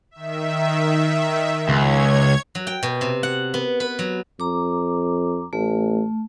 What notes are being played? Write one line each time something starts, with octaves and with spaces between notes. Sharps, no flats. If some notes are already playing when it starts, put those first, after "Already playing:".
D#3 E5
C#2 C#5 G#6
F#3
G5
B2
C3
F#5
B3
B4
F#3
F2 A#5 D6
A1 A3